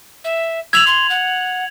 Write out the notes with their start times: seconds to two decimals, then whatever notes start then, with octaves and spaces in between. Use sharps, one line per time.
0.25 E5
0.73 E6 G#6 F7 F#7
0.87 C6
1.10 F#5